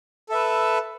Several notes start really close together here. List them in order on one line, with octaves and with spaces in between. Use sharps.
A4 E5 B4